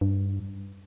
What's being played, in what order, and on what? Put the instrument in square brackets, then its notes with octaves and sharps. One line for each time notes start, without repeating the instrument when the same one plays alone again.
[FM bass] G2